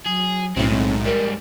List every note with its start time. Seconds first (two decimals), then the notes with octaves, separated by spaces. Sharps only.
0.06 F#3 G#4
0.57 B1 A2 D3 C4 C#4
0.70 G#2 C4
1.05 G#2 G3 A#4